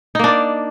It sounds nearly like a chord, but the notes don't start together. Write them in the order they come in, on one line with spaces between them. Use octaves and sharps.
D#4 A#3 D4 D5